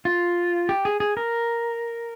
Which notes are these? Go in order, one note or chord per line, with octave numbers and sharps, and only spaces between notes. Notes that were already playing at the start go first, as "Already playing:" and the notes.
F4
G4
G#4
G#4
A#4